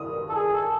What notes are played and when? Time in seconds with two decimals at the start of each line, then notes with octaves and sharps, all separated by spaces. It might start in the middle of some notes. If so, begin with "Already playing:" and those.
Already playing: D#6
0.30 A4
0.35 G#4
0.54 A4